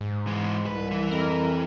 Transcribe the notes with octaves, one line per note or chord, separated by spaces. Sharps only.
G#2
E3 G#3
C2 B4
E3
F2 A#4